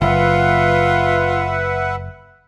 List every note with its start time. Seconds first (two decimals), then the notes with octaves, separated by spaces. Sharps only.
0.02 F#1 F4 B4 E5 F#5